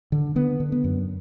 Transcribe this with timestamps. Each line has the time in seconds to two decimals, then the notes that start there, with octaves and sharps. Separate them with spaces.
0.12 D3
0.36 D3 B3
0.60 D3
0.72 B3
0.84 F#2